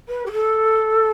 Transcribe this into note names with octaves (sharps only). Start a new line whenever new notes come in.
B4
G4
A4